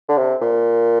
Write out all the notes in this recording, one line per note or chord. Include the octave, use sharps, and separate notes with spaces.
D3
C3
A#2